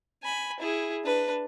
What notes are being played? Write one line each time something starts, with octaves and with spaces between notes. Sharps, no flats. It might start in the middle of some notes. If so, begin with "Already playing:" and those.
G#5 B5
E4 G#4
D4 B4